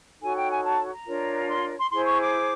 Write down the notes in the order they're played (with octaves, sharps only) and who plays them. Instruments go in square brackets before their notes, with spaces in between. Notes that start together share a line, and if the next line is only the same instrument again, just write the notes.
[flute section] D#4 F#4 A4 C#5 G#5
G5
G#5
A5
A#5
D4 F4 A#4 C#5
C6
C6
E4 G#4 C5 C6
C#6
D6